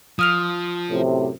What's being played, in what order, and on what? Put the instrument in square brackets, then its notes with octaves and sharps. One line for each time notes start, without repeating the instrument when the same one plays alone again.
[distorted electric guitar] F3 [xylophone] D#6 F6 F7
[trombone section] F#2 A2 C3